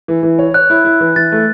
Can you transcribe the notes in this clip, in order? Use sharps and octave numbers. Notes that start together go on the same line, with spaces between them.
E3
E3
C#5
C#5 F#6
E4
E4
E3
E3 A6
A3